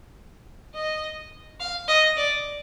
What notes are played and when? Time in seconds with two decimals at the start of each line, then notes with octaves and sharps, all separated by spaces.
0.75 D#5
1.60 F5
1.88 D#5
2.17 D5